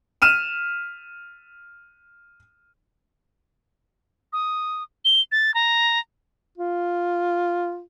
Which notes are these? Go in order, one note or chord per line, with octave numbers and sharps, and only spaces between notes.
F6 D#7 E7
D#6
G7
A6
A#5
F4